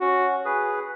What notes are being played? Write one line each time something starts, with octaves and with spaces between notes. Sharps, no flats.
C#4 F#4
G#4 B4